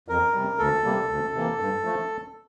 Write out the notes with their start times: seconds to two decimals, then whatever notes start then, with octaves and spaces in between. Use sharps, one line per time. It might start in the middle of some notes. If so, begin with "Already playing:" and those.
0.08 F2 A#4
0.34 C3 G3
0.59 D2 A4
0.84 C3 G3 A#3
1.10 D2
1.34 C3 E3 A#3
1.60 G2
1.84 F3 A3